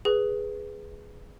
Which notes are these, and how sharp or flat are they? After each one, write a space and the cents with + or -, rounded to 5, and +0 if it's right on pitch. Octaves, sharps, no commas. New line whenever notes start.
G#4 +0 B4 +0